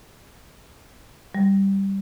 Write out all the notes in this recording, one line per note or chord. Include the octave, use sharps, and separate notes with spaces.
G3